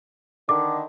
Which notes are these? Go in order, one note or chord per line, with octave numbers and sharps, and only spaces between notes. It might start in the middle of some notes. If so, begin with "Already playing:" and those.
D3 D#3 D6